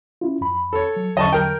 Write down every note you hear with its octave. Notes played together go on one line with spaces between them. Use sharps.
C#4 E4 F4
F2 B5
A4 C#5
F#3
E2 D3 F#3 D#5 A5 C#6
A#4 G5